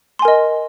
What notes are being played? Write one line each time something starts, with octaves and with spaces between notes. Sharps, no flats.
A#4 D#5 G#5 C6